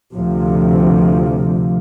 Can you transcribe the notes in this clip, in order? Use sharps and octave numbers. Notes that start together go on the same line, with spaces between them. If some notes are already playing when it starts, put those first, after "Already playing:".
D2 C3 F3